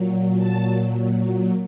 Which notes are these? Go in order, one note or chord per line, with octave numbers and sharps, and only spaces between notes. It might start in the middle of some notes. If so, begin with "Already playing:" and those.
Already playing: A#2 F#3
A5